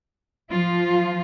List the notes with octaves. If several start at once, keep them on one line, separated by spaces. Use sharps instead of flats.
F3 F4